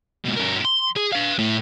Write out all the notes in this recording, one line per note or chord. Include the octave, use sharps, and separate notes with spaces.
G#2 B2
G2 A#4
C6
G#4
B4 F5
A2